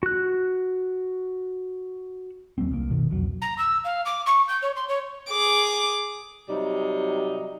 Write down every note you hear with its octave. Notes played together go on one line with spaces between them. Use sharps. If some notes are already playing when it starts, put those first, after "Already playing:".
F#4 F#6
D#2 F#3 A#3 C4
C2 A#3
F#1 B2 D#3
C2 F2 E3 F#3
A#5
E6
F5
D6
C#6
G6
C#5
C6
C#5
G#4 D6
C3 F#3 G3 D#4